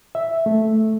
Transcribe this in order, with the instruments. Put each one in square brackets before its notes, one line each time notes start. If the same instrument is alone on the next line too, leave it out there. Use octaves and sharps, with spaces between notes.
[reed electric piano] E5
A3